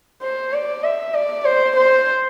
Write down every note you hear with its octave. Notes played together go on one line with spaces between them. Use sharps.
C5
D5
E5
D5
C5
C5